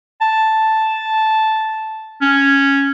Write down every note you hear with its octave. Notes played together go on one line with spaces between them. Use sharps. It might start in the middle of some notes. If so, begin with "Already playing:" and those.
A5
C#4